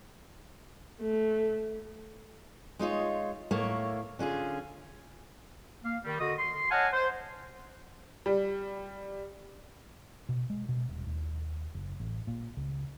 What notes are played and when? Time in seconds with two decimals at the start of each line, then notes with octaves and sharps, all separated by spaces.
1.01 A3
2.79 G#3 D#4 F4 C#5
3.51 A2 A3 A#3 C#5
4.19 D3 C#4 F4 G#4
5.84 A#3 F5
6.05 D#3 G3
6.19 D3 F#4 D#5 D#6
6.39 C6
6.71 C#5 D#5 F#5 G#5 A5 F6
6.94 C5
8.26 G3
10.29 B2
10.50 G#3
10.69 B2
10.88 D#1
11.07 D#2
11.75 F#1
12.00 A1
12.27 A#2
12.57 C#2